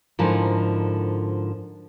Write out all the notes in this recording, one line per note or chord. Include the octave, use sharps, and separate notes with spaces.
G#2 D3 F3 E4 A#4 G#5